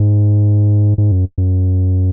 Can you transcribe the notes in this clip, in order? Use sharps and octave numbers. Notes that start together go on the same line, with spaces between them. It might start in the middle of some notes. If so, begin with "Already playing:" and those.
Already playing: G#2
G#2
F#2
F#2